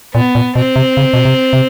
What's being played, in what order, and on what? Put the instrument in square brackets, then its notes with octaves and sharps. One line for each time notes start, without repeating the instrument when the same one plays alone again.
[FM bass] A#2 [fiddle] B3
[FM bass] A#2
[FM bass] B2 [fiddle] C4
[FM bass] C3
C#3
B2
C3
C3